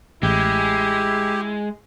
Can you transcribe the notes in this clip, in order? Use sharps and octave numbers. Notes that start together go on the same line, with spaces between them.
A1 G#3 E4 G4